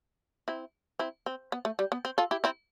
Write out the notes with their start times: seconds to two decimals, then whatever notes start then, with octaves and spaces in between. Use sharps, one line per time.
0.48 C4 E4
0.99 C4 E4
1.26 C4
1.52 B3
1.65 A3
1.79 G3
1.92 B3
2.05 C4
2.18 F4 A4
2.31 E4 G4
2.44 C4 E4